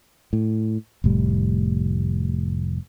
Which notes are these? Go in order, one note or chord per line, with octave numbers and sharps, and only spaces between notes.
A2
F1 A2 G3